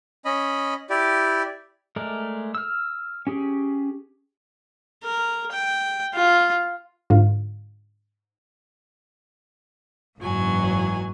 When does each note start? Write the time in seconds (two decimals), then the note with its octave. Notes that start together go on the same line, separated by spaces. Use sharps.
0.25 C#4 D#5 B5
0.90 E4 G4 D5
1.96 G#3 A3 A#4 D5
2.55 E6 F6
3.27 C#4 G4 G#4
5.03 A#4
5.52 G5
6.14 F4
7.10 G#2 D3 F4
10.20 F#1 G#2 E3 F#3 G#5